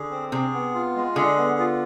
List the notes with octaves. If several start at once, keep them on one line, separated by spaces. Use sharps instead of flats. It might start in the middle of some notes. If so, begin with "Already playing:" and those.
Already playing: D3 G#4
C4
C3 G#4
B3
F4
G#3
D3 G#4
B3
F4